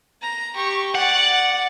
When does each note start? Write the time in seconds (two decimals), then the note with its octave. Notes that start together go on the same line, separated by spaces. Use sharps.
0.22 A#5
0.55 G4 C#6
0.95 D5 F#5